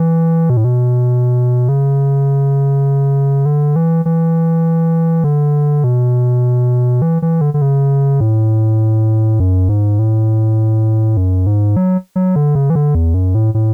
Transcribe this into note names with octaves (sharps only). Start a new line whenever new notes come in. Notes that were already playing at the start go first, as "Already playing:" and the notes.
Already playing: E3
B2
A2
B2
C#3
D3
E3
E3
D3
B2
E3
E3
D3
D3
C#3
A2
F#2
G#2
A2
F#2
G#2
F#3
F#3
D3
C#3
E3
D3
E2
F#2
A2
A2